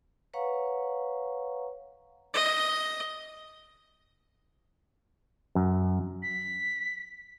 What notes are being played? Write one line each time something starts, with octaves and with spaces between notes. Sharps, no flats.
B4 C#5 F5 F#5 A#5 C#6
D#5
F#2
B6